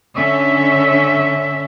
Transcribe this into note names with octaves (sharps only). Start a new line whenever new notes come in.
D3 C#4 E5